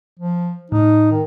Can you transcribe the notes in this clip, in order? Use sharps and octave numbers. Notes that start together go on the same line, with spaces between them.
F3
A2 D#4
D#3